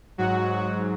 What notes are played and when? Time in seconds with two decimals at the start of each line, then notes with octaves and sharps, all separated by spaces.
0.18 G#2 F#3 F#4